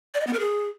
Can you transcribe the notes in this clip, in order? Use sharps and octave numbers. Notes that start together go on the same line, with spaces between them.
D5
D#5
B3
A#4
G#4